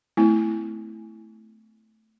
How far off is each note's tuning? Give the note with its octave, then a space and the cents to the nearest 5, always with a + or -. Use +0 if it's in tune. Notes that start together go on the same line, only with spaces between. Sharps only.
A3 +0 C4 -40 E4 +0